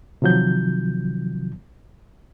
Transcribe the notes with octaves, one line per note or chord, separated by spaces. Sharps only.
C3 D#3 F3 F#3 G6